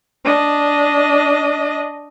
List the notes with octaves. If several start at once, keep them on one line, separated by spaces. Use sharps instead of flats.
D4 D#5